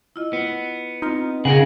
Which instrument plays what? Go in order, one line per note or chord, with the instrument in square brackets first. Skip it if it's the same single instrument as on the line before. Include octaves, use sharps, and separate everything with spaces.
[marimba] E4 F4 D#5
[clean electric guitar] B3
[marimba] C4 F4 D#5 [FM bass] D#4
[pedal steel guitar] C#3 [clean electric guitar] G#4 A#4 F#5